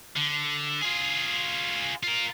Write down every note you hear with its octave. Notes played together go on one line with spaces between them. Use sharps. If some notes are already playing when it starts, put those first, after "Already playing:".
D3
F4 G#4
F4 A#4